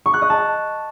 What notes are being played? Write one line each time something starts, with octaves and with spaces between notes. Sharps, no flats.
C#6
F#6
D#5
A5